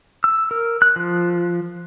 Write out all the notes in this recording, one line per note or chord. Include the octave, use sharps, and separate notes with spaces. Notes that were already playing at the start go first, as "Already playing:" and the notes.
E6
A#4
F#6
F3